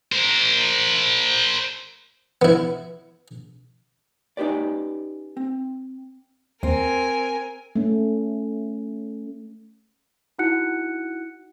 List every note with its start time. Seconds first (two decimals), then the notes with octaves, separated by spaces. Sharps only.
0.12 A#4 C5
2.42 B3 E4
4.37 C#4 D#4 F#4 G4 B4 D5
5.37 C4
6.63 D#2 C4 A#4 G#5
7.76 A3 C#4
10.39 D#4 E4 F#4 F#5 F#6 C#7